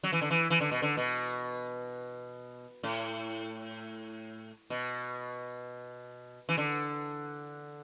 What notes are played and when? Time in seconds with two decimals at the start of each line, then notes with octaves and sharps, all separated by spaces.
0.04 F#3
0.13 E3
0.21 D3
0.31 E3
0.50 E3
0.61 D3
0.71 B2
0.82 D3
0.97 B2
2.83 A2
4.70 B2
6.49 E3
6.58 D3